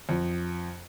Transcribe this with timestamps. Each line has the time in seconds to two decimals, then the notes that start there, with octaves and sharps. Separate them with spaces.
0.09 F2